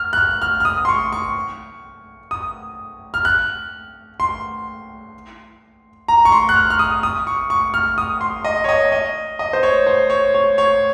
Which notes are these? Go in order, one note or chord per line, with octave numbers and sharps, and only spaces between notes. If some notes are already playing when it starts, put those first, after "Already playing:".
Already playing: F6
F#6
F6
F6
F6
D#6
C6
C#6
C#6
D#6
F6
F#6
C6
A#5
C#6
C6
F#6
F6
F6
D#6
D#6
C#6
C#6
F6
D#6
C6
D#5
C#5
D#5
D#5
D#5
C5
C#5
C5
C#5
C#5
C#5